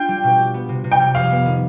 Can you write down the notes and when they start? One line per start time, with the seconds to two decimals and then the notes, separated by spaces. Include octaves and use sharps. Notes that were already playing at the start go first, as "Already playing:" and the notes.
Already playing: D4 F4 G5
0.08 G3
0.24 B2
0.39 G4
0.54 B3
0.69 C3
0.84 C3
0.92 G5
1.00 G3
1.15 F2 F5
1.30 B3
1.46 D#3